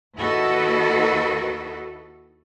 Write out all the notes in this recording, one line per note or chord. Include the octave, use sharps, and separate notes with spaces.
D#2 E4 F#4 A4 B4 D#5